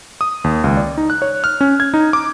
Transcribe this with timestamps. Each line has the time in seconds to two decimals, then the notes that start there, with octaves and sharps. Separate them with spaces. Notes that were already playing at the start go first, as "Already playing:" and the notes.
0.21 D#6
0.44 D#2
0.64 C#2
0.77 D5
0.98 D#4
1.10 F#6
1.22 C#5
1.44 F6
1.61 C#4
1.80 G#6
1.94 D#4
2.13 D6